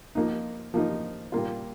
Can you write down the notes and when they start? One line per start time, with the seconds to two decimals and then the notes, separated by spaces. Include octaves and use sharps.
0.15 F3 A#3 D#4
0.74 F3 A#3 D#4
1.32 A#2 G3 A#3 F4